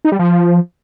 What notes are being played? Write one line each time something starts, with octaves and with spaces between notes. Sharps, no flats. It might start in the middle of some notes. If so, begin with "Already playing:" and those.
D#4
G3
F3